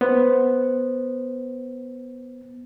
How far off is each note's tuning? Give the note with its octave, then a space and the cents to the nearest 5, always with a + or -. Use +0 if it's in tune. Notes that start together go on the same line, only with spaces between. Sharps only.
B3 +0 C5 +0